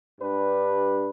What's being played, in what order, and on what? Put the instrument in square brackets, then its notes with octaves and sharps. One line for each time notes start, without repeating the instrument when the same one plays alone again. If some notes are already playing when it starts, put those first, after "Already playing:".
[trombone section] G2 G3 D4 B4